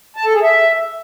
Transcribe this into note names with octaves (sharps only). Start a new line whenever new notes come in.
A5
A4
G#4
E5